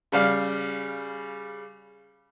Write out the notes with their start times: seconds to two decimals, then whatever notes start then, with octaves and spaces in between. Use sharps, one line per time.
0.12 C#3 G3 F5